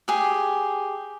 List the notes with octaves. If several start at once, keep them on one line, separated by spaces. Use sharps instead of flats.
G4 G#4